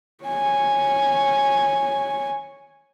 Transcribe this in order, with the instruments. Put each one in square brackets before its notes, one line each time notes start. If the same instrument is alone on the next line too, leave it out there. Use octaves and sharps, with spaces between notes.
[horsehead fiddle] C#5 G#5